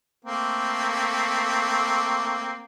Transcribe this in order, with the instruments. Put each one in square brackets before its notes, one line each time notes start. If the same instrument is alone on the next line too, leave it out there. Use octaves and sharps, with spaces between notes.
[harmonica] A3 A#3 C4